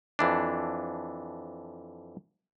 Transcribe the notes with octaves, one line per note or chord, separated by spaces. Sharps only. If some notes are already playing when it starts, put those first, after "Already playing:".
F2 E3 D4